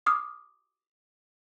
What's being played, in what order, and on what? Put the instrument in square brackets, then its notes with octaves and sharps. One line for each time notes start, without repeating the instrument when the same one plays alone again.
[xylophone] D6 D#6 F6